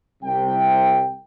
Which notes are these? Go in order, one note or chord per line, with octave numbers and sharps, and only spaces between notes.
C2 C3 G5